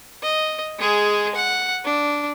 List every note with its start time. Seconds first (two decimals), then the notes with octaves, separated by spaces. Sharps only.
0.22 D#5
0.79 G#3 G#4
1.35 F#5
1.85 D4